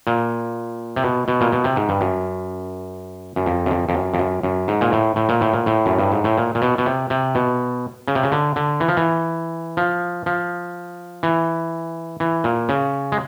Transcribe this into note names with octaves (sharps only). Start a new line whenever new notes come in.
A#2
C3
B2
B2
A#2
B2
C3
G#2
G2
F#2
F#2
F2
F#2
F2
F2
F#2
F2
F#2
F#2
G#2
A#2
A2
A2
A#2
A2
A#2
A2
F#2
G2
G#2
A2
A#2
A#2
B2
B2
C3
C3
B2
C#3
C3
C#3
D3
D3
E3
F3
E3
F3
F3
E3
E3
A#2
C#3
G#3